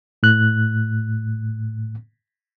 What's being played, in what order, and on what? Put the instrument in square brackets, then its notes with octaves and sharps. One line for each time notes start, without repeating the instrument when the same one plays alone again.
[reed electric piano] A2 F#6